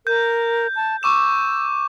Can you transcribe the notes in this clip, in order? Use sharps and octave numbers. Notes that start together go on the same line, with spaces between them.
A#4 G6
A5
C#6 D6 E6 E7